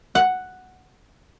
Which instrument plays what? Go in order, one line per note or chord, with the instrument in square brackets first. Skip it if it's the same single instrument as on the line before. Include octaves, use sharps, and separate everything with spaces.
[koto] F#5